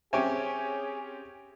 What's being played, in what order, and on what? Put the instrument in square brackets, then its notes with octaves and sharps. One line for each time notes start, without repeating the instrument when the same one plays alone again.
[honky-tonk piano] C4 C#4 D7 [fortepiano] G4 C#5 G#5 [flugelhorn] G#4 [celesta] E5